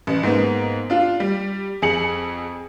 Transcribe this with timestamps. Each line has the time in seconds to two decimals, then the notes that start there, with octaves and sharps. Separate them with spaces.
0.07 A1
0.23 G#2 A#3 B3
0.90 D4 F4
1.20 G3
1.82 F2 G#4 C#7 F#7